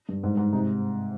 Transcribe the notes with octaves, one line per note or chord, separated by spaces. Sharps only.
G2
G#2
G#2
C3 D#4